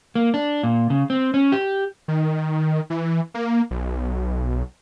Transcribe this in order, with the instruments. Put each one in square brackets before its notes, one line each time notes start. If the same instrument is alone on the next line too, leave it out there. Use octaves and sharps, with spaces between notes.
[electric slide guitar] A#3
D4
A#2
C#3
C4
C#4
G4
[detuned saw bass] D#3
E3
A#3
B1